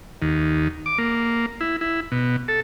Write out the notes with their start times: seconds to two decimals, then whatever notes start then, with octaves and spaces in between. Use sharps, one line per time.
0.22 D#2
0.86 D6
0.98 A#3
1.61 E4
1.81 E4
2.12 B2
2.48 A4